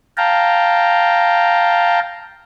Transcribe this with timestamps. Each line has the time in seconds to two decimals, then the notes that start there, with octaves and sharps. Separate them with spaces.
0.17 F5 G5 A5 A#5